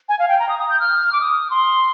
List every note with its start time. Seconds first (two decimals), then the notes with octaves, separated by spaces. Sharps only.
0.09 G#5
0.19 F5
0.28 G5
0.39 A#5
0.49 D#6
0.59 D#6
0.70 G6
0.80 F6
1.13 D6
1.21 D#6
1.50 C6